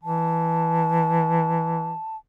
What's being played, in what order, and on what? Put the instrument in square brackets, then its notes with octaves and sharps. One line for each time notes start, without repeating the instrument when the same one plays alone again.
[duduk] E3 [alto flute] A5